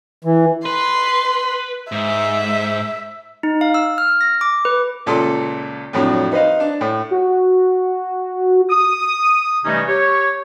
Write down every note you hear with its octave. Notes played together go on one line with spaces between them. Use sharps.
E3
B4 C6
G#2 E5
D#4
F5
E6
F6
A#6
D6
B4
C#2 A#2 A4 C6
F2 A2 F#3 D4
D#4 B4 C5 D#5 F5
D4
A2
F#4
D#6
C3 E3 G3 A3 C#4 D#4
G4 C#5